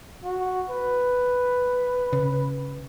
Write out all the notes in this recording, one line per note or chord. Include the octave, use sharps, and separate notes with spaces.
F#4
B4
C#3